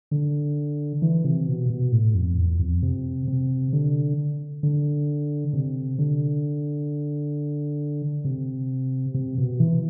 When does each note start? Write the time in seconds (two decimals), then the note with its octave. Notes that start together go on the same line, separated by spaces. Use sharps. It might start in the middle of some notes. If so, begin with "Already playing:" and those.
0.11 D3
1.02 E3
1.25 C3
1.47 B2
1.70 B2
1.92 A2
2.14 F2
2.37 E2
2.60 F2
2.83 C3
3.28 C3
3.73 D3
4.63 D3
5.53 C3
5.98 D3
8.24 C3
9.14 C3
9.38 B2
9.60 E3